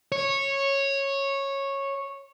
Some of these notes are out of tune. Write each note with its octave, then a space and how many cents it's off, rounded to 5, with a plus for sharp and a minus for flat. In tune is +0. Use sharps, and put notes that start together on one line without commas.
C#5 -10